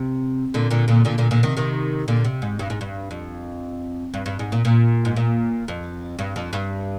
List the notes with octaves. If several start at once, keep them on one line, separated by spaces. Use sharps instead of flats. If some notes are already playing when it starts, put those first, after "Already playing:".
Already playing: C3
A#2 D3
A#2 D3
A#2 D3
A#2 D3
A#2 D3
A#2 D3
C3 D#3
C3 D#3
A#2 D3
C3
G#2
G2
G#2
G2
F2
G2
G2
G#2
A#2
A#2
G#2
A#2
F2
G2
F2
G2